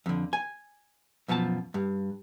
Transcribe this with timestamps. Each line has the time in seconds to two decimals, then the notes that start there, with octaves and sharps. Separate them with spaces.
0.06 F2 D3
0.33 G#5
1.28 F#2 B2 F3 F#4 A5
1.74 G2